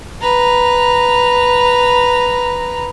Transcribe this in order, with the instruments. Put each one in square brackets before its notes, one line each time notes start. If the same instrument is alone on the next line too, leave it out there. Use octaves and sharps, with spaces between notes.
[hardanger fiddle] B4 A#5